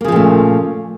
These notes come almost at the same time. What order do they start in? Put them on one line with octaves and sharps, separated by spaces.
A#3 C#3 F3 A#2 A3